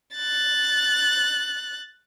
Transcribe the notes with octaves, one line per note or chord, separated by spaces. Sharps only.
F#6 A6